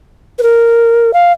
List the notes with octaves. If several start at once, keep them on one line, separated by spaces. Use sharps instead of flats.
B4
A#4
F5